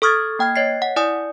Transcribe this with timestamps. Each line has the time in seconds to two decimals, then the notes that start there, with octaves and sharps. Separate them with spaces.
0.02 A4 C#6 D#6 F6 G#6 A6
0.39 A#3 G5 F6 G#6
0.56 C#5 D#5 A6 C7
0.82 F#5
0.96 E4 D5 G#5 D#6